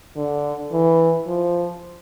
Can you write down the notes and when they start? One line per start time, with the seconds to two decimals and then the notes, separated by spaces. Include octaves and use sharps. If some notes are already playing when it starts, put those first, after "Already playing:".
0.17 D3
0.72 E3
1.27 F3